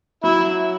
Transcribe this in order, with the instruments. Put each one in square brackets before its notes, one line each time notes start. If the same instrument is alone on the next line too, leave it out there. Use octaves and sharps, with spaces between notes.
[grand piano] F#3 [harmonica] E4